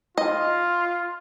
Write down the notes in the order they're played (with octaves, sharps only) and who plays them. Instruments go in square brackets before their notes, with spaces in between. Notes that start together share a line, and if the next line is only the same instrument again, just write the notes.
[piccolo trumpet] F4 [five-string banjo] D#5